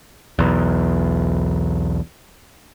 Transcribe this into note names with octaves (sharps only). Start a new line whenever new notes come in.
B1 E2